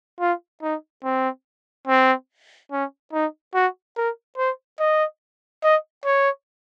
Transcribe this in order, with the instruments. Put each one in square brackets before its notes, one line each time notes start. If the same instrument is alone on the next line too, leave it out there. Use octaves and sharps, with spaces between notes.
[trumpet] F4
D#4
C4
C4
C#4
D#4
F#4
A#4
C5
D#5
D#5
C#5